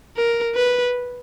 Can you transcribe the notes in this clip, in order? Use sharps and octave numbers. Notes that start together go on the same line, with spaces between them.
A#4
B4